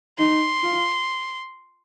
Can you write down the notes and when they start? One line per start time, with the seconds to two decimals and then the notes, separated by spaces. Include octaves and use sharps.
0.18 D#4 C6
0.63 F4